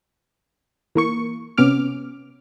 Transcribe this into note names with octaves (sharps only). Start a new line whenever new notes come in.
E3 A#3 C#6
C3 B3 C#4 D6 F6